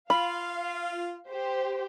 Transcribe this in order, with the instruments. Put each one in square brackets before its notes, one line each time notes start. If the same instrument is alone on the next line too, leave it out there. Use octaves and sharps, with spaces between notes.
[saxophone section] F4 [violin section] F5 [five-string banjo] B5
[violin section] G4 C5